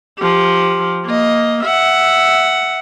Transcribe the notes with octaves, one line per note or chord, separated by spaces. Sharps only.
F3 G4
A#3 D#5
E5 F#5